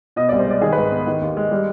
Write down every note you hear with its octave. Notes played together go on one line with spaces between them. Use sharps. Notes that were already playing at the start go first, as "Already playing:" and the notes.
B2 D#5
D5
C2
C5
G#3 D5
D#3 G#4
B4
G#2
B3
D#3
D#2
G#3
G3